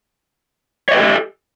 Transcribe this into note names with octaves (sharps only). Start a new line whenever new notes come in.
G4 A4 B4 C#5 D#5